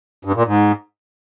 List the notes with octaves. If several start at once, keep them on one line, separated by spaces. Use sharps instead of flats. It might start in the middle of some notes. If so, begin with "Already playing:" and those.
G2
A#2
G#2